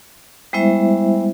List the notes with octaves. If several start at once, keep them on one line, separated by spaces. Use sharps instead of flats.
G3 G#3 B3 E4 C5 E5